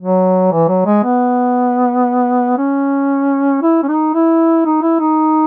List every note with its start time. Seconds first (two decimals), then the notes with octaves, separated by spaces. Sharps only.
0.01 F#3
0.52 E3
0.68 F#3
0.86 G#3
1.04 B3
2.58 C#4
3.62 E4
3.83 C#4
3.88 D#4
4.14 E4
4.65 D#4
4.82 E4
5.00 D#4